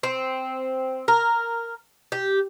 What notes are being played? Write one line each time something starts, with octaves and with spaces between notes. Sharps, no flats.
C4
A#4
G4